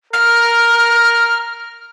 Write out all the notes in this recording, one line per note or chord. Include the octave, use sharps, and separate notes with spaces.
A#4 F6